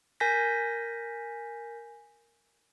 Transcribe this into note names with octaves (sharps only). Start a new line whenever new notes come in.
A#4 G#5 G6 A#6 B6